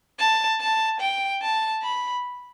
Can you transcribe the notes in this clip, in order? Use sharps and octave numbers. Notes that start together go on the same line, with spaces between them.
A5
A5
G5
A5
B5